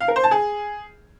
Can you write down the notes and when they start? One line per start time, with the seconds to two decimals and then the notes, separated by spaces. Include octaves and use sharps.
0.01 F5
0.08 A#4
0.16 C5
0.24 A5
0.31 G#4